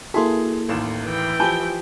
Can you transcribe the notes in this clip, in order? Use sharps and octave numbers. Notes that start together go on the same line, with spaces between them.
A#3 E4 F#4 G#4 A4 C6
A1 D#2 E7
E3 G5
F3 G4 G#5 A5 B5 G6 G7